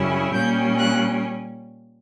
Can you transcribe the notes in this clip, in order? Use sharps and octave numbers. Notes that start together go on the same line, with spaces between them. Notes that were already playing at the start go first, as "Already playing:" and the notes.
Already playing: F#2 C#3 G3 C#4 E4
A#2 G3 A#3 C#4 G6
F#6